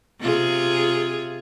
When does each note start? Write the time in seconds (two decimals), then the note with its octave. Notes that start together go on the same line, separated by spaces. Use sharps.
0.20 C3 F4 G#4